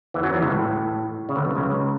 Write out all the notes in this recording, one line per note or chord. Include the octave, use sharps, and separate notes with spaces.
E2 E3
F#2 F#3
E2 E3
C#2 C#3
A2
C#3
D2 D3
B1 B2
C#2 C#3